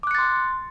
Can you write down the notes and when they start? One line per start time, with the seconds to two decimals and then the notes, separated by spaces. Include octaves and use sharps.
0.03 D6
0.07 F#6
0.11 C#7
0.15 A6
0.18 C6